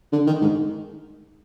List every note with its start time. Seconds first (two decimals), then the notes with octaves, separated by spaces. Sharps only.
0.12 D3
0.27 D#3
0.42 G#2